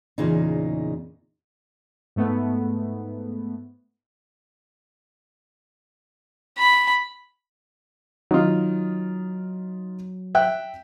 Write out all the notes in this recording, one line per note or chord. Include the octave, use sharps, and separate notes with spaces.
E2 A#2 C#3 D#4
G#2 A3 B3
B5
D#3 F#3 D#4 F4
E5 G5 F#6